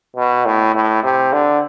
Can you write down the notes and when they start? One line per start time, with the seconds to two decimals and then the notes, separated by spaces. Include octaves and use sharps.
0.16 B2
0.46 A2
0.75 A2
1.03 C3
1.33 D3